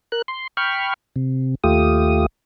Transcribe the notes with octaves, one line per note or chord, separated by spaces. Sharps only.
A#4 F#6
C6
G5 B5 C#6 F6
C3
D#2 A3 F4 G4 D#6